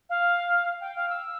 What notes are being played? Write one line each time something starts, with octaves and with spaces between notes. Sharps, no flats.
F5
G5
F5
E6